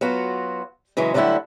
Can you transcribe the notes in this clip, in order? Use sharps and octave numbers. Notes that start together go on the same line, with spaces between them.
F#3 B3 F4 F#4
C#3 E3 F#3 G#3
D2 D3 F#3 G3 E4 F#5